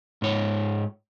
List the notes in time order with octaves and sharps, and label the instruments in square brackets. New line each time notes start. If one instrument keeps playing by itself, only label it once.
[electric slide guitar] G#2 C#5